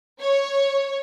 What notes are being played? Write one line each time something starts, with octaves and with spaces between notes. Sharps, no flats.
C#5